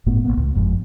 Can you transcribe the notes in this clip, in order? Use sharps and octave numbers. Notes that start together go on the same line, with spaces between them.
G1 A2 A3 B3
A#1 F3 A#3 B3
C#2
G1 F2 G#2